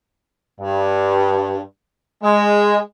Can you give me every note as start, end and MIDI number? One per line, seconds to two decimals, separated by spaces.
0.59 1.59 43
2.22 2.78 56